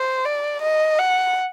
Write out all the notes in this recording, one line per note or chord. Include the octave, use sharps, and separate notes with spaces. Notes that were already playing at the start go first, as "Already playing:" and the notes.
Already playing: C5
D5
D#5
F#5